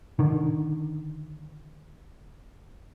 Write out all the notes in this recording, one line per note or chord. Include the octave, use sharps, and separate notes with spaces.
D3 D#3